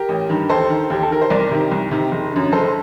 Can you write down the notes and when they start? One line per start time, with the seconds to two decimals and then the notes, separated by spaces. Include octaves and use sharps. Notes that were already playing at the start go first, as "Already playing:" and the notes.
Already playing: G4 A#4
0.09 A1
0.29 G2 D#3
0.49 D#2 A4 C5
0.69 D#3
0.90 D#2 G4
1.03 A4
1.10 D#3 A#4
1.21 C5
1.30 C2 A#4 D5
1.51 C3 D#3
1.71 C2
1.91 C3 D#3
2.11 F#1
2.32 F#2 D3
2.52 F#1 A4 C5